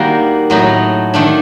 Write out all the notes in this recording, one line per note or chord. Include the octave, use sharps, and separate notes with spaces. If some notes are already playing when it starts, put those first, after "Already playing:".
Already playing: D#3 G3 A#3 F#4 A#4
A2 F#3 A3 D#4
D#3 A3 D4